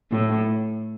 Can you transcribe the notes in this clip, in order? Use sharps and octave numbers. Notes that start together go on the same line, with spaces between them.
A2